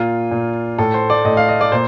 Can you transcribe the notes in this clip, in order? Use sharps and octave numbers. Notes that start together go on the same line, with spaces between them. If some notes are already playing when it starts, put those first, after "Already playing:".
Already playing: A#2 F4
A#2
A2 A4
C5
D5
A2 D#5
F5
D#5
D5
A#2 C5